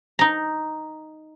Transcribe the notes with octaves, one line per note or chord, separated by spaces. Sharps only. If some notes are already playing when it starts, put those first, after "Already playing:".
D#4 A#5